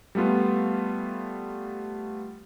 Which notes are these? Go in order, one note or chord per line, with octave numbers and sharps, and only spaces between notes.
G3 A3 B3 F4